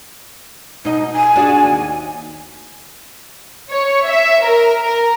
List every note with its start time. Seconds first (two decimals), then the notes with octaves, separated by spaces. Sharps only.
0.85 B2 D#4 D#5
1.13 G#5
1.36 D4 F#4 G#4
1.65 D#2
3.70 C#5
4.07 E5
4.44 A#4
4.83 A#4